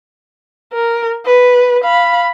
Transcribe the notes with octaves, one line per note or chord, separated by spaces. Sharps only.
A#4
B4
F5 B5